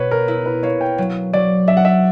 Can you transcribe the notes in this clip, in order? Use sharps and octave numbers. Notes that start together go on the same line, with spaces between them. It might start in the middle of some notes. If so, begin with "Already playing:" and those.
Already playing: B2 B4 C#5
A#4
E4
B4
A#3 C#5
G5
F#3
F#3 D5
D4 E5
F#5
E5